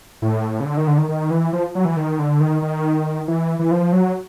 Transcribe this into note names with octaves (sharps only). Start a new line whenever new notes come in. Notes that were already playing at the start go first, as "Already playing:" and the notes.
A2
C#3
D3
D#3
D3
D#3
D#3
E3
F3
F#3
E3
D#3
D3
D#3
D#3
E3
E3
F3
F#3